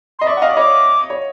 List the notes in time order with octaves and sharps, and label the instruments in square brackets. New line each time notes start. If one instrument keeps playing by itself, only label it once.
[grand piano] D#5 [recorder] C6
[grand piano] D5 E5 [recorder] C#6
[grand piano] F#5
D#5 F5
D5
[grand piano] C#5 D#5 [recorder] D6
[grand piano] C#5